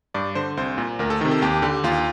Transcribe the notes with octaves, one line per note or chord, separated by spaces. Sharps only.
G2 D5
D3 C5
C2 C5
A#2
D2 A#4
A4
C3 D#3
A4
D#2 G4
D3 G4
D#2 F4